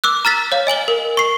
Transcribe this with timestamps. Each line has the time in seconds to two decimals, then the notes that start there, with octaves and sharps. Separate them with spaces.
0.04 D6 E6 F#6
0.25 A#5 F6 A6 B6
0.52 C#5 F5
0.67 D#5 G#5 F#7 G7
0.88 A#4
1.17 C#6 C7